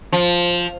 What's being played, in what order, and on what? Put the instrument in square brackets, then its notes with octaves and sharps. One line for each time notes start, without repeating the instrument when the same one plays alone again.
[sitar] F3